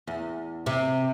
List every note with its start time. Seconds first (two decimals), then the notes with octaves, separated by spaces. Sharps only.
0.07 E2
0.66 C3